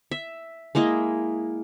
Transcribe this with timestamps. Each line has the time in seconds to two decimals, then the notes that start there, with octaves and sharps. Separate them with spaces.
0.11 E5
0.75 G#3 A#3 E4 D#5